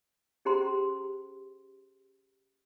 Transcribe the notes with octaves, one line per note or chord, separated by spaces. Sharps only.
C#4 G4 G#4 C5 A#5 C6